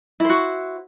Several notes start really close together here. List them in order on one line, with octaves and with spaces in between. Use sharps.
E4 C5 F#4